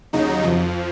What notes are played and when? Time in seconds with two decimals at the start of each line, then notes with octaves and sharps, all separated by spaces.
0.13 D#2 C#3 F#3 D#4
0.43 F2 F3